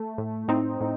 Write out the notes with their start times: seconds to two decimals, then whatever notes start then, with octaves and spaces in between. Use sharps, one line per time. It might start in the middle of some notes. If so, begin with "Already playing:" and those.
Already playing: A3
0.18 A2
0.48 A2 C4 D#4
0.81 A2